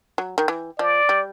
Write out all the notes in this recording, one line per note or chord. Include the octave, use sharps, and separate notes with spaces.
F#3
D#3
E3
F3 D5
G3